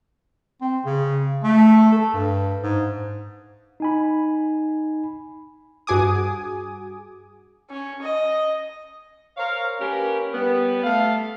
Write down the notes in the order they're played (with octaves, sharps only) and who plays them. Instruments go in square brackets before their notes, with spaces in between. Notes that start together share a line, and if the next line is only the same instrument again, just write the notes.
[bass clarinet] C4
C#3
A3
A4
G2
G#2
[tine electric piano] D#4 G#5 B5
[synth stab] G2 F#4 G#4 G#5 D6 D#6
[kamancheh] C#4
D#5
[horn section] A#4 C5 C#5 F5
A#3 C#4 G4 A#4 B4
G3 B3
A3 F5